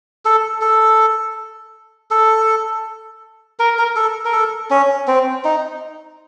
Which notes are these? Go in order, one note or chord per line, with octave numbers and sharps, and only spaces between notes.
A4
A4
A4
A#4
A#4
A4
A#4
A4
C#4
C4
D#4